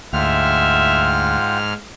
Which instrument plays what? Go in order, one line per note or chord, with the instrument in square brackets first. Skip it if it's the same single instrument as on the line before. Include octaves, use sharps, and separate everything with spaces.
[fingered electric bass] D2 [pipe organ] G#2 F6 [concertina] F4 F#5 G5 [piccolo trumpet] E5